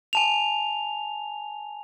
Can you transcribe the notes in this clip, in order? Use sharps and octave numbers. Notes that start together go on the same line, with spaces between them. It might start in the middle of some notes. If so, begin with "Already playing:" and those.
G#5 A5 F7